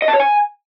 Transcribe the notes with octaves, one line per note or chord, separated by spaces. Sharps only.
D#5
A5
C#5
G#5